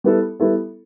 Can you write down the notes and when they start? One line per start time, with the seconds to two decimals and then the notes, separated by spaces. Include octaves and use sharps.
0.04 G3 B3 E4 A4
0.40 G3 B3 E4 A4